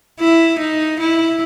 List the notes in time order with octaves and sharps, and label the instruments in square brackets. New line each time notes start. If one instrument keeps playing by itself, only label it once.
[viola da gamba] E4
D#4
E4